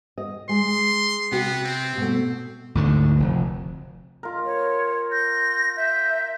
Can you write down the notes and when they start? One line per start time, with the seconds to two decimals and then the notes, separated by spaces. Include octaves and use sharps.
0.18 D#5
0.49 G#3 C6
1.32 C3 B3 F#4
1.64 C4
1.97 B2 A3
2.75 D2 G#2 D3
3.20 F1 F2
4.23 F4 A#4
4.45 C#5
5.11 G6 A#6
5.76 E5 G6